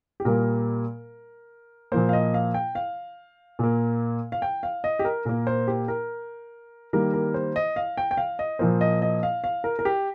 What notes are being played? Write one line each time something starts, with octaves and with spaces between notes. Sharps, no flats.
G4
A#2 G3 A#3 A#4
A#2 F3 A#3 C5
F5
D#5
F5
G5
F5
A#2 A#3
F5
G5
F5
D#5
G4
A#4
A#2 A#3 A#4
C5
G4
A#4
D#3 G3 A#3 A#4
A#4
C5
D#5
F5
G5
G5
F5
D#5
A#2 F3 A#3 C5
D#5
D#5
F5
F5
A#4
A#4
G4